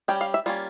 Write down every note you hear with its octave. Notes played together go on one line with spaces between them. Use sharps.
G3 C#4 G5
F5
E5
G3 A#3 C#4 F4